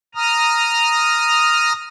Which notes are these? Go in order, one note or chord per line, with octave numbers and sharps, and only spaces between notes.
A#5 D#6 F6